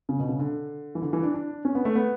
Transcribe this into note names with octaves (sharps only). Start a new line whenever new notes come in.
C#3
B2
C#3
D3
E3
D3
E3
D4
D4
C#4
B3
A3
B3